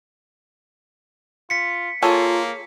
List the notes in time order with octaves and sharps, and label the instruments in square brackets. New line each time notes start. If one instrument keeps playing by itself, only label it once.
[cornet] F4 [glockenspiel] B6 C#7
[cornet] A#3 [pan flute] F4 [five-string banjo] G#4 A4 C#5